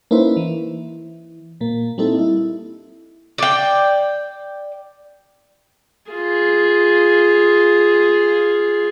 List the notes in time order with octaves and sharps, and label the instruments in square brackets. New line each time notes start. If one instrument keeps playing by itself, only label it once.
[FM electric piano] A#3 C#4 D#4 E4 B4 C5
E3
A#2 A#3
G3 A#3 C4 D#4 E4 A4
E4
[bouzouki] D5 G5
[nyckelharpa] F4 G#4